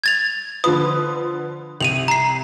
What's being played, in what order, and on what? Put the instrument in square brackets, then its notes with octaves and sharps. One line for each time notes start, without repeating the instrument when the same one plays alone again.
[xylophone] G#6 A6 F7
[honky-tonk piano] D3 F3 B4 [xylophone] D#6
[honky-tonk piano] C2 [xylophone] D#7 F7 F#7
[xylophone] A#5 C7